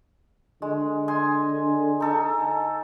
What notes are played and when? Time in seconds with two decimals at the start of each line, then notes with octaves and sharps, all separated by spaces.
0.62 D3 G#3
1.08 D#5 G#5 C6
2.00 D#4 A4 G#5